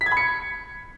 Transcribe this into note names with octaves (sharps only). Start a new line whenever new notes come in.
B6
G#6
B5
C#7